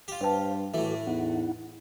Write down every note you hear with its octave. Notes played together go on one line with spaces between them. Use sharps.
F4 G4
G2 B4 C5 F5 G5 A5
A2 E3 A3 F#4 A4 D6
E2 D#4 E4 F#5